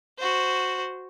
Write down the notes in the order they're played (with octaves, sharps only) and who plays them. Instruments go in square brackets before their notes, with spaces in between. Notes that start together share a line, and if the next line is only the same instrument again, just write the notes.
[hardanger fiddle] F#4 C5